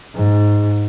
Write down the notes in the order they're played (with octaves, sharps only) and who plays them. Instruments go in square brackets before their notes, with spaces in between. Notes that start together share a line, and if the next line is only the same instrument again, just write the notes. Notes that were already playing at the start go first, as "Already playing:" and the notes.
[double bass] G#2